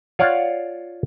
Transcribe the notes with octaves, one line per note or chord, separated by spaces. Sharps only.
F4 C#5 D5 F5 F#5